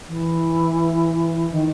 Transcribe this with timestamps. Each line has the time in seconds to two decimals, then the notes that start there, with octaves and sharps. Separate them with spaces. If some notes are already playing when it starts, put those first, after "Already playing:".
0.08 E3
1.51 D#3